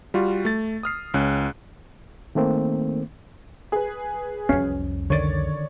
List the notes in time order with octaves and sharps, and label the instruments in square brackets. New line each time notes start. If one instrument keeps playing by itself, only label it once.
[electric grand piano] G3 F4 F#4
A3 A6
D#6 F6 C7
C#2 C#4 F#6
[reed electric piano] D#3 A3 A#3 C4
[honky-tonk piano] G#4 B4
[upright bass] C2 F2 [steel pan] C#4
[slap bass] D3 D#3 [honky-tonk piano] C#5 D5 A6